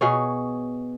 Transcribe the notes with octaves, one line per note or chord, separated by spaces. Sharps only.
B2 G#4 C#5